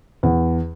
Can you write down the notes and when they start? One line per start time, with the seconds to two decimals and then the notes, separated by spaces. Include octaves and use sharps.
0.23 E2